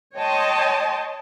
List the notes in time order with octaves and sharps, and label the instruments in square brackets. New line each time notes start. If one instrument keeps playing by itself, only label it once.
[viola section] C#5 D#5 G5 A5 C6